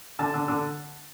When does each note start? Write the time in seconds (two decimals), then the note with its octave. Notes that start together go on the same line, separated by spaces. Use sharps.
0.19 D3 A5
0.34 D3
0.48 D3